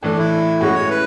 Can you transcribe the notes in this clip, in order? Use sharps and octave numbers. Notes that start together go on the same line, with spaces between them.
A2 E3 A3 D4
E4
A2 G#3 C#4 F#4
C#5
B4